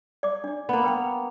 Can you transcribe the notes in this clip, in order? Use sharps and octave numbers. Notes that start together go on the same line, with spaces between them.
D5 D6
D4 D5
A#3 B3
B4 G5 B5